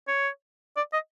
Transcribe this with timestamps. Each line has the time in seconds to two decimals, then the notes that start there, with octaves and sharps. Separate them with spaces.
0.08 C#5
0.77 D5
0.93 D#5